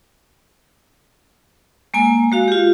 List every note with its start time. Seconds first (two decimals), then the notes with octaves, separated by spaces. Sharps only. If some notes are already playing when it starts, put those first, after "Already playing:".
1.94 G#3 A#3 G#5
2.32 G#3 F#4 F5
2.48 F4 G4